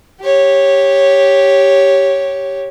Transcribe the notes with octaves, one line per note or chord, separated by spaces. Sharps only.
G4 C#5